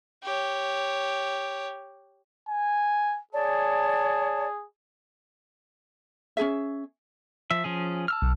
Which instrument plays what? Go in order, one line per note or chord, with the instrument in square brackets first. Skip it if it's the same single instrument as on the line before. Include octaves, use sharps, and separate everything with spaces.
[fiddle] G4 C#5
[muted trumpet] G#5
[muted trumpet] G#4 [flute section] C#5 D5 A5
[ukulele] C#4 D#4 G#4 E5
[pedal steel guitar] F3 E5
F3 C#4 G#4
A5 E6 F6
[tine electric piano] B1